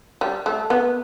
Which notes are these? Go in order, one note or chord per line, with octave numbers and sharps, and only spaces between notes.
G3
A3
B3